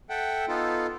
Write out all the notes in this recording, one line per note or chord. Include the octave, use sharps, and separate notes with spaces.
A4 E5 F#5 G5
B3 D#4 F4 A4